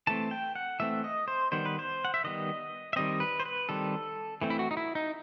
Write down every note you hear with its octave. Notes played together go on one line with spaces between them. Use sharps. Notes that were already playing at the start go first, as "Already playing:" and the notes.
E3 A3 C4 A5
G5
F#5
E3 A3 C4 E5
D#5
C5
D#3 G3 B3 C5
B4
C5
F#5
E5
D#3 G3 B3 D#5
E5
D#3 G3 C4 D#5
B4
C5
B4
D#3 G3 C4 A4
E3 A3 C4
E4
F#4
D#4
E4
D#4